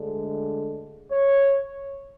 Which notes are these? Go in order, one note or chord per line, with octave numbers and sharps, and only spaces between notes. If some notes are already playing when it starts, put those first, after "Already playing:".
Already playing: D2 D3 G#3
C#5